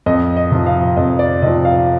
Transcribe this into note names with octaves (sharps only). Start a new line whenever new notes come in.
F2 D#5
D#5
C3 F3
F5
F2 D#5
D5
C3 F3 D#5
F5